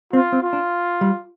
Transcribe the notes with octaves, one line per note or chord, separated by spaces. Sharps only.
C4 F4
C4
F4
D4
G3